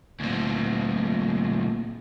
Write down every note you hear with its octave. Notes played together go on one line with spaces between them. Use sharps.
D2 A#2